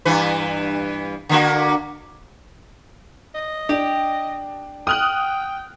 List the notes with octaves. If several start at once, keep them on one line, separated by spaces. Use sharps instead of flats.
G2 E3 B4
D3 A#3 F#4
D#5
D4 G4
G5 D#6 F6 F#6